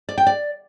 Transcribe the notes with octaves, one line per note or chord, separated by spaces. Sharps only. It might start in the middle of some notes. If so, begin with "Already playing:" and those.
D5
G5
D5